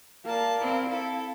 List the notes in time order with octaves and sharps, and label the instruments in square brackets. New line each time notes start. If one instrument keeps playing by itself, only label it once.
[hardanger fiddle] A#3 A5 [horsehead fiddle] A#4 D5 [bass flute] F5
[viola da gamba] C4 [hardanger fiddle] E4
[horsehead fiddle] C4 [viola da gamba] E4 [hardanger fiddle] A4 [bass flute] F5